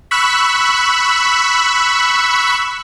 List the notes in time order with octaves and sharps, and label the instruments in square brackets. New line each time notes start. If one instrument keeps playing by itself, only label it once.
[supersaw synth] B5 C#6 E6 F#6